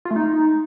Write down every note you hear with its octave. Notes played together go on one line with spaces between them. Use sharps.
F4
A3
D#4